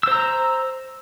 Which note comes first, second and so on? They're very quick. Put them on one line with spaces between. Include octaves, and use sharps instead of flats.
E6 C5 A#5